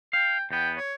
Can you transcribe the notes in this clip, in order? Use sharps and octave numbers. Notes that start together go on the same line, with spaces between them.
F5 G5
E2 B3 G5
C#5